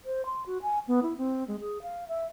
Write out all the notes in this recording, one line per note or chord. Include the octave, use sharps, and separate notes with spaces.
C5
C6
F#4
G#5
B3
E4
C4
G#3
G#4
F5
E5